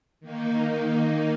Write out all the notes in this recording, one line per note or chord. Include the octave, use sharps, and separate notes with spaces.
D#3 A#3 D#4